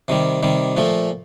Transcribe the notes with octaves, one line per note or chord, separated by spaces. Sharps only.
C3 D#3 G3
C3 D#3 G3
A#2 F3 A3